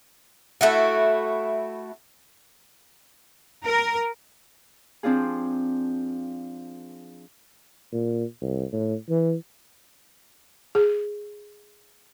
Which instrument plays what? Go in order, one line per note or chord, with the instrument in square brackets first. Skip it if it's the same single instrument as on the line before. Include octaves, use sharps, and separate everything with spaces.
[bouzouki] A3 E4 F#4
[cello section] A#4
[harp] F3 C4 D4 F4 G#4
[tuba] A#2
C2
A2
E3
[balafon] G#4